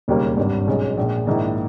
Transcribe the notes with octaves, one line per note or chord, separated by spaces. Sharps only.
E1 D#2 C#3 G3 A#3
G#1 G2 G3
B1 B2 G#3 C#4
A#1 A#2 G#3
A#1 G#2 D#3 A#3 E4